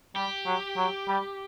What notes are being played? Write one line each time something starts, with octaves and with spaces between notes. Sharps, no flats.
G3 G4
F#3
F#3
G3